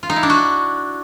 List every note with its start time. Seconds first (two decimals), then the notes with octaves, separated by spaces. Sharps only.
0.03 F4
0.10 D#4
0.16 E4
0.23 D4
0.30 F#4